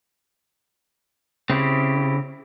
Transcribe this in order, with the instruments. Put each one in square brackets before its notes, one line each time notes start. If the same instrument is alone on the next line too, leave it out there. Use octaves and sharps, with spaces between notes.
[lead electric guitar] C#3 [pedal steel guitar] C4 E4 G4